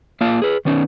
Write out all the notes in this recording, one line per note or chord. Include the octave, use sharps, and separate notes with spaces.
A#3 F4 F5 A5
G#4 B4
D#3 B3 C#4 D#4